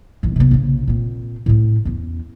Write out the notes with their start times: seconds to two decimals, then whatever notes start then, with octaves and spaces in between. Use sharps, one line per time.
0.23 A1 D#3
0.36 C3 B3
0.51 A#1 C#3
0.88 A#2 C4
1.46 A2 C4
1.85 E2 C#4